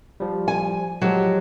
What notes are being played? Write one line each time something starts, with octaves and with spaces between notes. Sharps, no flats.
F3 G3
G#5
F3 F#3 G#3 G4